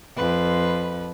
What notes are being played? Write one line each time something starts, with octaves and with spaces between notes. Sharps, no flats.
F2 B4